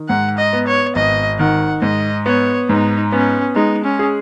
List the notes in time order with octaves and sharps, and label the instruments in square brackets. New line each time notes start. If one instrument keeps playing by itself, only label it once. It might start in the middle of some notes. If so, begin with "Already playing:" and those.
Already playing: [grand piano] D#3
[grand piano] G#2 [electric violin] F#5
[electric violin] D#5
[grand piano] B3
[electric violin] C#5
[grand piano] G#1 [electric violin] D#5
[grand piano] D#3 [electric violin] F#5
[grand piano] G#2 [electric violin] D#5
[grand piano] B3 [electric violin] C#5
[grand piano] G#2 [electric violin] D#4
[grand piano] B3 [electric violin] C#4
[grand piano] G#3 [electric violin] D#4
[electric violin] C#4
[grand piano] G#4